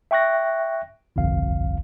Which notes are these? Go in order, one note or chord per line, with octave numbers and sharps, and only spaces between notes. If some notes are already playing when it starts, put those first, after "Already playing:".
E5 G5 C#6 F#6 A#6
G1 C2 F2 F5